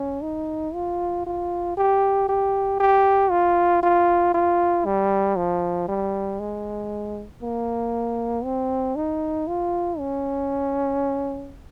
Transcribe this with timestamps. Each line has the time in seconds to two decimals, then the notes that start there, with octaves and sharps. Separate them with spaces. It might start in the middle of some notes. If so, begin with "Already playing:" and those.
Already playing: C#4
0.23 D#4
0.74 F4
1.26 F4
1.77 G4
2.29 G4
2.80 G4
3.31 F4
3.83 F4
4.34 F4
4.85 G3
5.36 F3
5.88 G3
6.40 G#3
7.42 A#3
8.44 C4
8.96 D#4
9.47 F4
9.99 C#4